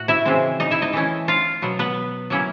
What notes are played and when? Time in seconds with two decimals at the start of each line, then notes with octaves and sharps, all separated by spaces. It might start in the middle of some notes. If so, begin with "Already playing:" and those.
Already playing: A2 A3 F#4 F#5
0.08 E4 E5
0.25 C#3 E3 G#3 C4
0.60 D#4 D#5
0.71 E4 E5
0.82 D#4 D#5
0.93 E3 A3 C#4 E4
1.28 F4 F5
1.62 B2 F#3 B3
1.79 B3 B4
2.30 F#3 A#3 C#4 E4